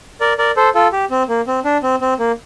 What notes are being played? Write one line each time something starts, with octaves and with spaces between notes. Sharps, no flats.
A#4 D5
A#4 D5
A4 C5
F4 A4
G4
C4
A#3
C4
D4
C4
C4
A#3